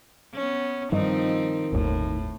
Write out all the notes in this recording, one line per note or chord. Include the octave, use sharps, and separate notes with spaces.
B3 C#4
G2 D#3 F3 C4 D#4
G1 D#2 A2